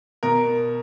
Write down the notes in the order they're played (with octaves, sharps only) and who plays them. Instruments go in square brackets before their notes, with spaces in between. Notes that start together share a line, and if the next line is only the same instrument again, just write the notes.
[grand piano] B2 A#4